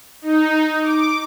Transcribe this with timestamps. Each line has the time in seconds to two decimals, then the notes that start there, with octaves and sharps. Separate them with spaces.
0.22 D#4
0.81 D6